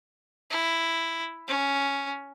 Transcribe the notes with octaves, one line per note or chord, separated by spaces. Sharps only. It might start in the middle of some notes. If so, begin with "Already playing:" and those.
E4
C#4